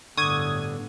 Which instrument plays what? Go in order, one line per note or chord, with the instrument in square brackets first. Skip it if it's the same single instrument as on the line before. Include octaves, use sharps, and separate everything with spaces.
[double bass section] G1 A2 [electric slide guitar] D3 [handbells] C#6 [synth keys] D#6 G#6